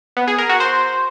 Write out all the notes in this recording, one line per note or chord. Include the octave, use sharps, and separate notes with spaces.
B3
G#4
A#4
F#4
C5